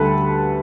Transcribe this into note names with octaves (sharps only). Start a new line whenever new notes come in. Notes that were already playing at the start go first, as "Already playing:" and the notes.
Already playing: D2 D3 G3 A4 B4